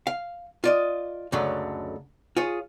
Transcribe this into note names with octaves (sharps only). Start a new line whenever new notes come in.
F5
F4 D5 D#5
C#2 F#2 D3 F#3 A3
F4 G#4 C#5